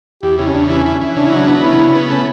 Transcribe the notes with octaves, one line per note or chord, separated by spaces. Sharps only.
E2 G4
C#3 E4
C#4
E2 D4
E3 C#4
E3
E3
C#3 D4
E4
F#3 D4
B3
C#3 E4
C#3
B3
A3 C#4